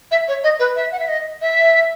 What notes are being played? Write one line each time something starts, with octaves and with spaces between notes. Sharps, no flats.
E5
C#5
D#5
B4
E5
F#5
E5
D#5
E5